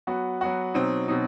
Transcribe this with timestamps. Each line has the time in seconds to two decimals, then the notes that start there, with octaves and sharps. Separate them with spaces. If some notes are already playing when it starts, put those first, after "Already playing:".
0.07 F#3 B3 F#4
0.41 F#3 B3 F#4
0.74 B2 F#3 C4 D#4
1.08 B2 F#3 C4 D#4